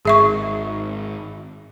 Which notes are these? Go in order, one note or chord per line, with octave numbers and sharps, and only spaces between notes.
G#1 G#4 E5 C#6